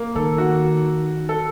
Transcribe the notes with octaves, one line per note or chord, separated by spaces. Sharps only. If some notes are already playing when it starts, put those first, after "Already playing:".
Already playing: A#3
D#3 A4
F#4
A4